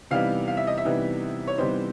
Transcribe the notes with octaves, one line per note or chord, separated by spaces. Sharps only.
C3 E3 G3 B3 D#4 F5
F5
E5
D#5
E5
C3 E3 G3 B3 D#4
C#5
C3 E3 G3 B3 D#4 C5